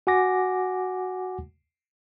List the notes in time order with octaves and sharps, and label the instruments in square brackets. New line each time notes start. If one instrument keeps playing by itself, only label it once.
[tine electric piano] F#4 F#5 G#5 D6 A#6